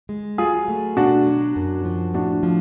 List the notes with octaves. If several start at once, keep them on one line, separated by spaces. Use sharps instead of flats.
G#3
F#3 F4 G#4
A3
B2 D4 F#4
F#3
F#2
F3
A2 D4 F#4
F3